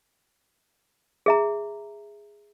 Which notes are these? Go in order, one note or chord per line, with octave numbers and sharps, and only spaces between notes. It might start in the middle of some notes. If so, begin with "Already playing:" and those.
G#4 E5 A#5